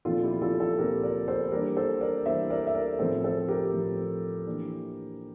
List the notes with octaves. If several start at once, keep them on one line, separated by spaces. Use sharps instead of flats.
A#2 F3 C4 F4 A4
E4 G4
F4 A4
F4 A4
A#2 F3 C4 G4 A#4
A#4 D5
A4 C5
E3 G3 A#3 D4 G4 A#4
A4 C5
A#4 D5
E3 G3 A#3 D4 C5 E5
A#4 D5
E5
A#4 D5
A2 F3 C4 A4 C5
A4 C5
G4 A#4
A2 F3 C4
E3 A#3 D4